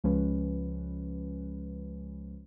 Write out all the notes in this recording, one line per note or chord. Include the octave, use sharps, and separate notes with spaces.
C#2 F3 G#3 C#4 B4